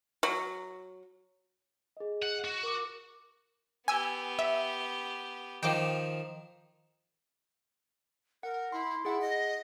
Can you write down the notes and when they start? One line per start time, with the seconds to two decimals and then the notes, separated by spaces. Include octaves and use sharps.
0.23 F#3
1.97 G#4 D#5
2.23 F#5
2.45 F#4
2.63 A#4 D6
3.88 B3 G4 G#5 E6
4.39 E5
5.63 D#3 F3 G5 D6
8.43 A#4 F#5
8.72 E4 C6
9.05 E4 G#4 F#5
9.21 D#5